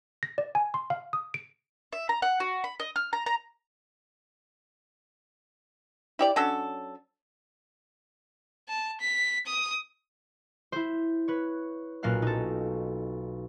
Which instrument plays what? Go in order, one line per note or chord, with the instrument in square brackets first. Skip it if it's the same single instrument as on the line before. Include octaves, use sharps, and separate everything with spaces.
[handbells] A#6
D5
G#5
C6
F5
D#6
D7
[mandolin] E5
A#5
F#5
F#4
B5
D#5
F6
A#5
A#5
[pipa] E4 G4 D5
F#3 C#4 D4 A4
[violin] A5
B6
D#6
[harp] E4 C5
B4 C#5
B1 A#2 A#3 C#4 F5 F#6
D#4 A4